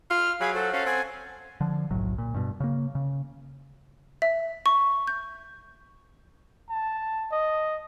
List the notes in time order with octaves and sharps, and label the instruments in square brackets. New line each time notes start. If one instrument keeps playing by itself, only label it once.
[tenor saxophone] F4 [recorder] F6
[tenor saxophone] F#3 [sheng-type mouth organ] G#4 G#5 B5 [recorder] F5
[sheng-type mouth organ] F#4 C5 [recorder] A4
[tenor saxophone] C#4 [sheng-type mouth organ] A4 C5 F#5 [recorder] F5
[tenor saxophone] C4 [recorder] G#5
[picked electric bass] D3 F3
F#1 B1 A2 F#3
A#2
G2 B2
C#3 A#3
C#3
[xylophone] E5
C#6
G6
[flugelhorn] A5
D#5